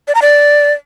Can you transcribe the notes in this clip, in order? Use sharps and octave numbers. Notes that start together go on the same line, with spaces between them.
D5
A#5
D5